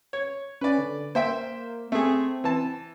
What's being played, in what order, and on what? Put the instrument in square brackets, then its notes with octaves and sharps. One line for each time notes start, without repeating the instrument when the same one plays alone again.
[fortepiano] C#5
[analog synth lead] C#4 [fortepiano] B4 D5
[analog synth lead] D3
[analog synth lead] A#3 [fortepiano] C5 E5 G5
[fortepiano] A3 G#4 [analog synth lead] C4
[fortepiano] E3 A5